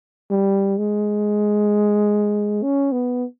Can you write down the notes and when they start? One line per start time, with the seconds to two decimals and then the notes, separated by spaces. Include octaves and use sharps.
0.31 G3
0.78 G#3
2.63 C#4
2.92 B3